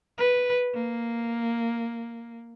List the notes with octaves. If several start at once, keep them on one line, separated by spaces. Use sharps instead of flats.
B4
A#3